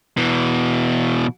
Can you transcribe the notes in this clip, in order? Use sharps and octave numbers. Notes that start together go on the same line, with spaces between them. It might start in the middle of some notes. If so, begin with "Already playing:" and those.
B2 E3